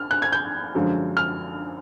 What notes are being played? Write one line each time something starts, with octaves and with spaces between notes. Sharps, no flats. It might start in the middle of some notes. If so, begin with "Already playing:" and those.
Already playing: F6
F#6
G#6
G6
F#2 D3 F3 G#3
F6